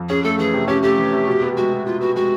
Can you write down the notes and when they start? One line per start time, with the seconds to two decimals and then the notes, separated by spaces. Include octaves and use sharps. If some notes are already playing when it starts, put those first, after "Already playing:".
Already playing: F2
0.09 C#4 G#4
0.24 A3 A4
0.38 E3 G#4
0.53 C3
0.68 C#4 G4
0.83 A3 G4
0.97 E3
1.13 C3
1.27 B2
1.43 B3
1.57 G#3 F#4
1.72 B2
1.86 B2 F4
2.01 B3 F#4
2.16 G#3 F#4